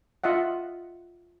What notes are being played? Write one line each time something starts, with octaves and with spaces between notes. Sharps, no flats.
F4 D#5 E5 F#5